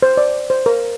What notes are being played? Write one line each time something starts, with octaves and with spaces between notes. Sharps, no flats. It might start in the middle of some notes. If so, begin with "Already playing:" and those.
C5
D5
C5
A#4